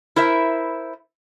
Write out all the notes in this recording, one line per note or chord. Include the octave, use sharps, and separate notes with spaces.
E4 A#4 C5 E5